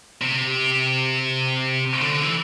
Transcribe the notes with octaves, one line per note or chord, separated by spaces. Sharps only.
C3
D3
E3